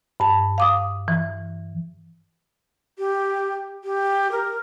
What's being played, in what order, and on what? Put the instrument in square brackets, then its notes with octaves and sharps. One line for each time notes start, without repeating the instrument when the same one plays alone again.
[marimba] G2 A5
F5 D6 D#6
E3
[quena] G4
G4
A#4